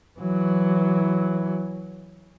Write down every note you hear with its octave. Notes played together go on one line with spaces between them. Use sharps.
E3 F#3